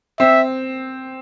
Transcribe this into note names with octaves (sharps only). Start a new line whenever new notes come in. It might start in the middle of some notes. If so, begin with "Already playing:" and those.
C4 E5